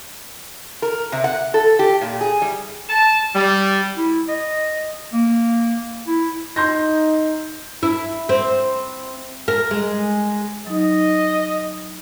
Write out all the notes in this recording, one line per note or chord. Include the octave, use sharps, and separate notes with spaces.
A#4
C3
F#5
A4
G4
A#2
G#4
G3
A5
G3
E4
D#5
A#3
E4
D#4 C6 G6 A#6
E4
C4
A#4
G#3
F#3 D#4 D#5